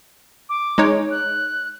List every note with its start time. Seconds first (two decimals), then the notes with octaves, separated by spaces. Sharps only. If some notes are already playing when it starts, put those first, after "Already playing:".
0.49 D6
0.78 G#3 D#4 C#5
1.11 F#6